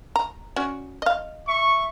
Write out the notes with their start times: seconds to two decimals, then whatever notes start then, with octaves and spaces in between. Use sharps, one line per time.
0.16 A#5
0.56 C#4 F#4 D5
1.02 D#5 F5
1.47 E5 C#6